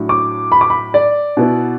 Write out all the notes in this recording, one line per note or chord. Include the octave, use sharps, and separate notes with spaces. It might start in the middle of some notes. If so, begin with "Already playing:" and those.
Already playing: A2 F#3 D4
D6
B5
D6
B5
D5
B2 B3 E4